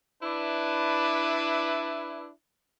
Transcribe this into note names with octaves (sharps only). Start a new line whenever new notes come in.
D4 E4 B4